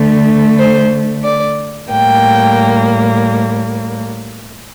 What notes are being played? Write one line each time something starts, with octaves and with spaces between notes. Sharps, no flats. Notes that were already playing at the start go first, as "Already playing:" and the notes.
Already playing: D3 A3
C5
D5
A2 G3 A#3 G5